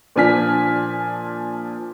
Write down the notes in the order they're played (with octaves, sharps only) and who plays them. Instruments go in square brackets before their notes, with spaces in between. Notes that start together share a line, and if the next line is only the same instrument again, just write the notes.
[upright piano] A#2 F3 D4 G#5 F6 B6